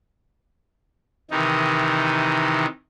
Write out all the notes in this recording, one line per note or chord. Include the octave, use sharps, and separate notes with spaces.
C3 D#3 E3 D#4